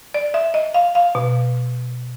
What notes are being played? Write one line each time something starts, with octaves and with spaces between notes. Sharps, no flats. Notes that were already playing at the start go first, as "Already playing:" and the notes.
D5
E5
D#5
F5
F5
B2